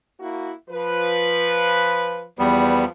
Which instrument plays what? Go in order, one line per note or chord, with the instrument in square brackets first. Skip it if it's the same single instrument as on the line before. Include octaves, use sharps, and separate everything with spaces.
[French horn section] A#3 E4 F#4
F3 B4
[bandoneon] E2 G3 B3 [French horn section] F3 B4